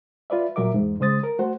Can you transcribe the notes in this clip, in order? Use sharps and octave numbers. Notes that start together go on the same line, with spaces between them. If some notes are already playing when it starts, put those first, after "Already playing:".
F4 B4 D5 E5
A#2 F#3 A#4 E5 D6
E2 G#2
C#3 G#3 C5 D#6 A6
A#4
A3 F#4 C5 F#5